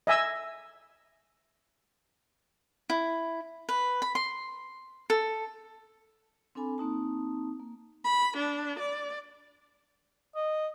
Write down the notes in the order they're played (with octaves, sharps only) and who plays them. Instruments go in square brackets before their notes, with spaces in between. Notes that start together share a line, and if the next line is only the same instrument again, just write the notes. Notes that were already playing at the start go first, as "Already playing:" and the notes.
[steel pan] D#5 E5 G#5 E6
[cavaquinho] E4
B4
B5
C6
A4
[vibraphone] C4 D4 A4 G#5 B5
A#3 C4 D#4 A5
A#3
[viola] B5
D4
D5
[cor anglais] D#5